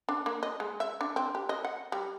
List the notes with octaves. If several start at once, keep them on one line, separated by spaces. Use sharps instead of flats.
D4
A#3
D#5
G#3
E5
D4
C4
G4
D#5
F#5
G3